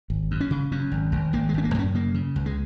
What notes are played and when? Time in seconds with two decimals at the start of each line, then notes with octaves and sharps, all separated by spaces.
0.10 G#1
0.31 F#2
0.40 C#4
0.51 C#3
0.72 F#2 C#4
0.92 G#1
1.12 G#1
1.33 G#1 A#3
1.49 G#3
1.54 G#1 C#4
1.64 A#3
1.74 F#2 C#4
1.94 C#3 A#3
2.14 C#3
2.36 C#2
2.46 G#3